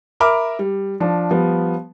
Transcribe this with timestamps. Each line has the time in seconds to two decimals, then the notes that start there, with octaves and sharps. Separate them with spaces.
0.20 A#4 E5 B5 D6 F6
0.59 G3
1.00 F3 D4
1.31 F3 G3 B3